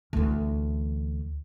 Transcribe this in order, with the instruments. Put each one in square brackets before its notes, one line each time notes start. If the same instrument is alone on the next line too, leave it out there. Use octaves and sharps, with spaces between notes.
[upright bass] D2 E3